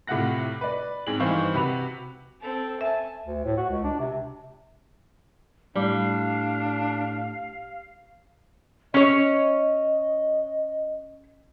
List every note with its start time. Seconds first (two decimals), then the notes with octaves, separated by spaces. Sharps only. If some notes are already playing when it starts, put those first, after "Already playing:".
0.07 A2 C3 F4 F#5 F#6 A#6
0.61 B4 D5
1.07 G#2 C4 G#4 F#7
1.20 G2 D#3 E3 C5 F5 C#6
1.54 C3 F#4 B4 B5 F7
2.41 C4 A4
2.81 E5 G#5 A5
3.26 D2
3.45 A2
3.57 F#4
3.70 C#2
3.84 D4
3.99 C3
5.76 A2 G3 D4 F5
8.94 C#4 C#5 D#5